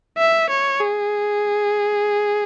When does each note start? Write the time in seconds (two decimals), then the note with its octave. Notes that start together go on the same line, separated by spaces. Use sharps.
0.18 E5
0.49 C#5
0.80 G#4